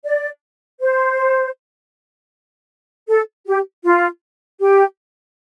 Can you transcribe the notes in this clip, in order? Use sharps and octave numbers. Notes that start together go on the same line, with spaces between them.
D5
C5
A4
G4
F4
G4